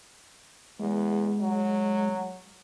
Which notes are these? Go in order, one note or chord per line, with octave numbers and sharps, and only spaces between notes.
E2 G#3
F#3